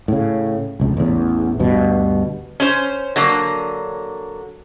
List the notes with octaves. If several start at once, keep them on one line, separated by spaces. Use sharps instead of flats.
A2 C#3
F1 C#2
A1 E2
D2 G2 B2
C#4 C5
D3 F#3 A#3